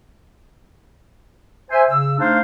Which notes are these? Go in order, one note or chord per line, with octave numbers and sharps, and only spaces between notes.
C5 E5 G#5
C#3 E6
A3 D4 D#4 C5 F5